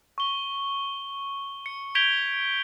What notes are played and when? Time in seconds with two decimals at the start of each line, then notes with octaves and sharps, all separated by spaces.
0.18 C#6 G7
1.66 C#7
1.95 G6 G#6 B6 D7 F7 G7